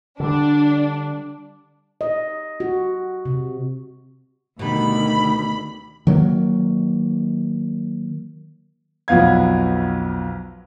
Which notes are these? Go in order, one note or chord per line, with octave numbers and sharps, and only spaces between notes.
D3 G3 D4
D#5
F#4
C3
D2 B2 D#3 G3 B5
D#3 F#3 A3 A#3
B1 F2 B3 F5 G#6